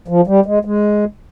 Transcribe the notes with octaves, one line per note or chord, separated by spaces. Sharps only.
F3
G3
G#3
G#3